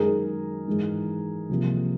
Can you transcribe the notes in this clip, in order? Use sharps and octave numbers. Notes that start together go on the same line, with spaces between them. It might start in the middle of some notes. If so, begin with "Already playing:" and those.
Already playing: F#2 D#3 G#3 G#4 A#4
G#2 E3 G#3
C2 C3 F3 A#3